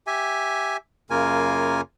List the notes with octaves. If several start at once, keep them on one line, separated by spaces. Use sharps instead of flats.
G4 E5 G#5
F#2 C#3 A#3 F4 A#4 G#5